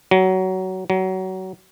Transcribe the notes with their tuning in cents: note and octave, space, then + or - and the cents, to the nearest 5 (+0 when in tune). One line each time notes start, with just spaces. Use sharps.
F#3 +20
F#3 +25